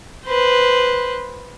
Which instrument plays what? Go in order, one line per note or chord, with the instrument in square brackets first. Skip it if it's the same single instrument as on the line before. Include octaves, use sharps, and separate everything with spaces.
[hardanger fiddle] B4 C5